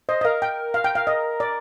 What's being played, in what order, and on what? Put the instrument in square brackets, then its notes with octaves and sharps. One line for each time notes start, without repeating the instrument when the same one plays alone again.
[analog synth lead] C5 [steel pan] D#5
[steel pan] D#5
[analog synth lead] A#4 [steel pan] F5
[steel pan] G5
F5
G5
F5
D#5
D5